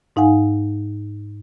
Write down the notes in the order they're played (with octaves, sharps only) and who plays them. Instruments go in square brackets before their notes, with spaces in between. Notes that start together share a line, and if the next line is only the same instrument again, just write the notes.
[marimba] G#2 D#4 F5 F#5 G#5